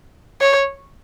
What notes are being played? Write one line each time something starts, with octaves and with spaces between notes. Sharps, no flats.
C#5